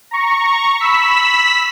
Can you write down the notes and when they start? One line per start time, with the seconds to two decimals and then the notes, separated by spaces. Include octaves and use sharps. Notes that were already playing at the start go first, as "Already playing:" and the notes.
0.11 A#5 C#6
0.79 B5 E6 B6